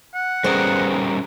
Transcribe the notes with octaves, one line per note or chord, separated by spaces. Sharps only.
F#5
G3 B3 C#4 G#4 A#4 C5